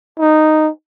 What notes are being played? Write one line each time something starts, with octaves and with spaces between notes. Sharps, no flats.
D#4